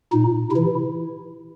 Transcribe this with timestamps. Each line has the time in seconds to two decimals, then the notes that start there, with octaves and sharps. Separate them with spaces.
0.12 A#2 D#4
0.51 C3 E4
0.56 E3